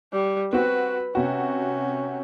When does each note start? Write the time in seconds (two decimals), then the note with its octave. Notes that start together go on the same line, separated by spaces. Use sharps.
0.13 G3
0.53 C4 F#4 B4
1.15 C3 C#4 F#4